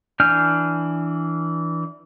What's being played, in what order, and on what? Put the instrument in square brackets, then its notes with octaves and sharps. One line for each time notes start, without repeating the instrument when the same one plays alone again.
[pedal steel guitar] E3 D4 G#5 F6 G6